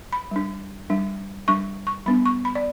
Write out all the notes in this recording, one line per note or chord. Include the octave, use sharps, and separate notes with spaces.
B5
G3 D4
G3 D4
G3 D4 C#6
C#6
G3 B3 D4 B5
C#6
B5
D5